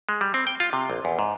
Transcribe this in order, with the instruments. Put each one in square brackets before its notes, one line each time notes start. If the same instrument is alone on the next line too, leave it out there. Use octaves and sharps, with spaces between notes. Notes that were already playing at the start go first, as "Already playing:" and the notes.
[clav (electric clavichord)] G#3
G3
C4
G5
F4
C3
A#1
E2
G#2